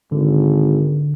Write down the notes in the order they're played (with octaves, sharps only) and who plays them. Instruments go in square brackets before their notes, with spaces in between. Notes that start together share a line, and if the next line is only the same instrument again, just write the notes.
[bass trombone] G#1 [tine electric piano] D3